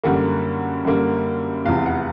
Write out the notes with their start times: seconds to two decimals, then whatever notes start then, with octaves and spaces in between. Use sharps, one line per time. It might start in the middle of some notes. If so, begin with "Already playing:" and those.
0.04 F#2 D3 G3 A#3 F#5
0.85 F#2 D3 G3 A#3
1.65 F1 E2 C3 F5
1.86 F#5